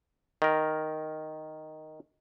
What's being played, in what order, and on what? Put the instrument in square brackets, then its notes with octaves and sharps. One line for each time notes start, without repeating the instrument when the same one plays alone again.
[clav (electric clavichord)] D#3 A#4